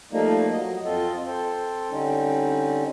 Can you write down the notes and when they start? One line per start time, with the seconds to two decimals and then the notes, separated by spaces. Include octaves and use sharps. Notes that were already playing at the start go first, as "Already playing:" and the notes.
0.12 F3 G3 A3 A#3 D#4
0.52 F#3 D#5
0.85 F2 C4 F4 A4 D#5
1.26 C4 A4 C5
1.91 D3 G3 C4 C#4 D#4